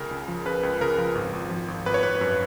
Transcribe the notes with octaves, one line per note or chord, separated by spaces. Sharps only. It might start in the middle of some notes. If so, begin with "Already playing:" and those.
Already playing: C#2 C#3 A#4
C#2
F3
C#3 B4
C#2
C#3 A#4
F3
G#1
G#1
F3
G#1
G#1 B4
C#5
G#1 B4
F#2